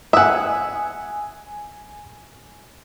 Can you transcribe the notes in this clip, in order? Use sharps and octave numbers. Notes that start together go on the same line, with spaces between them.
E5 F#5 G#5 D#6